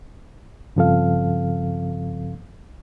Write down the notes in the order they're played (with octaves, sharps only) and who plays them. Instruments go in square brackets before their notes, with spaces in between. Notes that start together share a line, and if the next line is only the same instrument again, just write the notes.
[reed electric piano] G2 C#3 F3 C4 A4 F5